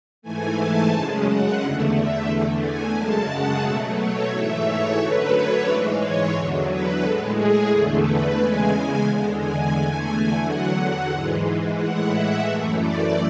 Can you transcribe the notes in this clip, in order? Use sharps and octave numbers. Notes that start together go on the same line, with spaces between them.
G#2 E3 A3 G#5
A5
F#2 C#3 G#3 A5
F#5
E2 D3 A3
E5
E2 D3 A3
G#5
F#2 C#3 G#3 A5
F#5
B2 F#3 A3 E5
C#5
G#2 E3 A3 E5
C#5
F#2 D3 F#3 A3 B4
C#5
G#2 E3 G#3 D5
C#5
E2 D3 F#3
B4
A2 G#3 A4
G#4
E2 D3 A3
B4
E2 C#3 G#3 G#5
E2 D3 G#3
G#5
E2 D3 A3 G#5
E2 D3 F#3 F#5
G#2 E3 G#3
A2 E3 G#3 F#5
E5
F#2 E3 A3
D5